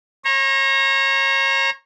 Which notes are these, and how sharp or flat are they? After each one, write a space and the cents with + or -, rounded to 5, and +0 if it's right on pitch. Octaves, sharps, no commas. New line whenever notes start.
C#5 -35 A#5 +10